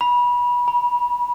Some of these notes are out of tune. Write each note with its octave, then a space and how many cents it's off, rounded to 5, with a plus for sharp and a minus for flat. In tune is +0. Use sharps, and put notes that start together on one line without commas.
B5 -25
B5 -45